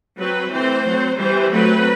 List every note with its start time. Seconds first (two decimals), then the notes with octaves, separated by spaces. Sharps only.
0.18 F#3 C4 B4
0.51 E3 A3 C4 C5
0.86 F#3 C4
1.18 E3 G3 B3 C5
1.51 F#3 A3 C4 B4